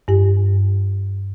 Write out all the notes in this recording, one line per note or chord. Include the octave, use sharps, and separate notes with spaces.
G2 G4